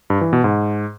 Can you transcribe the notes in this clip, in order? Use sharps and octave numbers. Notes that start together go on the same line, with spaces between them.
G2
E3
B2
G#2